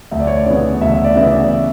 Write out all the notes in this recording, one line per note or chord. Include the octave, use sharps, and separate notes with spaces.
D2 E5
D5
C#5
D5
C#3 E3 B3
D2 E5
E5
D5
C#3 E3 B3 E5
D5
E5